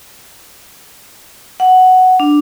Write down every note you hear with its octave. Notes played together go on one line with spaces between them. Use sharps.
F#5
D4